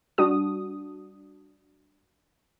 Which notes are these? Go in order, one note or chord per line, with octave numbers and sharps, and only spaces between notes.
G3 D4 F#4 D#6